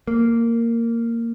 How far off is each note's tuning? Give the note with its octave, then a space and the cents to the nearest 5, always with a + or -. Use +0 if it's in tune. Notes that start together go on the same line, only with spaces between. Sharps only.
A#3 -10